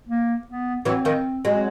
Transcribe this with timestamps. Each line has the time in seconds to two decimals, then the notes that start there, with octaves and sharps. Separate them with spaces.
0.07 A#3
0.47 B3
0.85 E3 F#3 C4
1.05 D#3 F3
1.45 F#3 G#3
1.54 C4